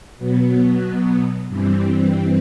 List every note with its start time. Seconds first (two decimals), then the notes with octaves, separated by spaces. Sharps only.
0.18 B2 F#3 B3
1.48 G2 E3 G3 C4